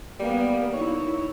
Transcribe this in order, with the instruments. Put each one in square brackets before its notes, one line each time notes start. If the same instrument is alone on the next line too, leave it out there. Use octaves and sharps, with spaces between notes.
[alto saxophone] G3 [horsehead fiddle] A#3 B3
[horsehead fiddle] D#4 E4 [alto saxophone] C#5